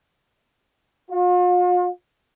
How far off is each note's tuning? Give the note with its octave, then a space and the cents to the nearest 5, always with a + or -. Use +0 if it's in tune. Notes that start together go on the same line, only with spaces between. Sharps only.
F4 +45